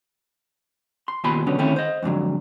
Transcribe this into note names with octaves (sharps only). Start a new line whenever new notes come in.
C6
D#2 B2 F4 G#5 B5 C6
B2 D3 F#3 B3 C#4
D3 D#3 A3 C4 C#4 E4
C5 D#5
F2 G#2 D3 F#3